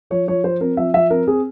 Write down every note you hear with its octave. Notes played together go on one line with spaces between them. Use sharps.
F3 C#5
F3 C#5
F3 C5
C4 A#4
F3 E5
F3 E5
C4 A#4
C4 G#4